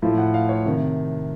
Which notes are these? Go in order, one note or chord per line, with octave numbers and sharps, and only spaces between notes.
A2 F3
F#5
F5
C#5
C3 D#3